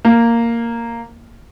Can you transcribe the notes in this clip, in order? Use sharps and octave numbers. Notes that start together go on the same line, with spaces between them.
A#3